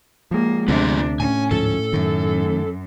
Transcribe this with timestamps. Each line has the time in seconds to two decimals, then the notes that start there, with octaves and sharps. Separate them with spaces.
0.31 F3 G#3 A#3
0.68 D2 C3 B3 D4 F4
1.20 A2 C#4 G#5
1.51 D2 G#2 F3 A4
1.93 F#2 D#3 F#3 A3